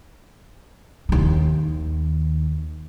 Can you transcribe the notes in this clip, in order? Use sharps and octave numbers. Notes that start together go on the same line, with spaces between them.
D#2 D#3